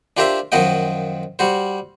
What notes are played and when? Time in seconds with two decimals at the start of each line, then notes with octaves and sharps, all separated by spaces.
0.17 D4 F4 G4 A#4 C5 E5
0.52 F#2 D#3 F3 F#4 D#5 G5
1.39 G3 F#4 C5